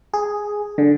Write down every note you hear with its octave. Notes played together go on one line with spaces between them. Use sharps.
G#4
D3